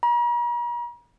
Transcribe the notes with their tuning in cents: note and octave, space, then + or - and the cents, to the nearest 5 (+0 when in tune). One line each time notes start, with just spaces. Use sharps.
A#5 +45